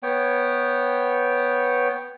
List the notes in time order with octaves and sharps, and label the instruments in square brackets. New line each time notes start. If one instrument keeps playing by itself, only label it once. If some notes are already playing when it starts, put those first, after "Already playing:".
[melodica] B3 C#5 G5